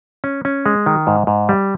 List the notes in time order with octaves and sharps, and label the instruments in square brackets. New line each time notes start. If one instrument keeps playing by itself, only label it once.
[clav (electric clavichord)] C#4
C#4
G#3
D#3
G#2
G#2
G3